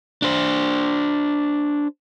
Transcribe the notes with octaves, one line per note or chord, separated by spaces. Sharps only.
D4 C5